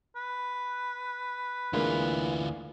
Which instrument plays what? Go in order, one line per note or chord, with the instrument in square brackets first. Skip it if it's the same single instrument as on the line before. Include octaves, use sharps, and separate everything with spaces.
[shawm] B4
[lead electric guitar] D2 F4 [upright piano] D3 G#3 A#3 [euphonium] E3